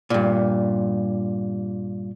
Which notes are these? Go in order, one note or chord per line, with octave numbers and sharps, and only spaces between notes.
G2 A#2